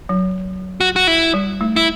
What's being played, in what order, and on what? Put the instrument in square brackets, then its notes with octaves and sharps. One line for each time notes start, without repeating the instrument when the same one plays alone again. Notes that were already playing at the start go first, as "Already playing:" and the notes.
[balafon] F#3
[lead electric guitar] F#4
F#4
E4
[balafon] G3
A3
[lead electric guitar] E4